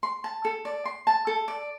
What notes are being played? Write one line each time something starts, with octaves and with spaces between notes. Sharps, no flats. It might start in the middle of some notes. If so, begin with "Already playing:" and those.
C6
A5
A4
D5
C6
A5
A4
D5